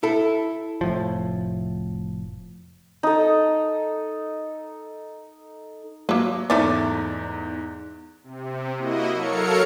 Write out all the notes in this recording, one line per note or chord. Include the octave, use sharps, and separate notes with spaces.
E4 A4
F1 A2 F3
D#4 A4
F#3 A#3 B4
E2 G#2 A3 C#4 E4 C5 D5
C3
A#3 E4 F#4 D#5
F#3 A4 A#4 C#5 F5 C#7